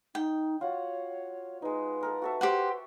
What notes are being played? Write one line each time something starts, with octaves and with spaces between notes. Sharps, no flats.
D#4 G5
F4 F#4 C#5 F#5
G#3 D#4 B4
A4 A#4 A#5
F#4 A4 E5
G4 C5 F#5